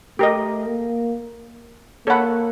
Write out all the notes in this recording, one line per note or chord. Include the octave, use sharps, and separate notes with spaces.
A3 G4 A#4 D#5
A#3
A#3 A4 C#5 F#5 B5